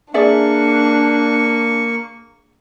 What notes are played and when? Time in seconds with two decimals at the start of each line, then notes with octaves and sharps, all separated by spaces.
0.14 A#3 D4 G#4 D5 E5 C#6